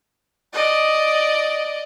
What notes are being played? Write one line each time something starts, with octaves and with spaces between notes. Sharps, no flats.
D5 D#5